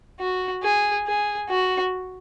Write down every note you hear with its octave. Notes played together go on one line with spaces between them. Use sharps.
F#4
G#4
G#4
F#4